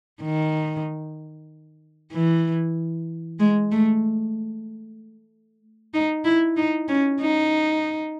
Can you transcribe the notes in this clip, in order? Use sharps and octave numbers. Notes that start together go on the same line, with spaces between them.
D#3
E3
G#3
A3
D#4
E4
D#4
C#4
D#4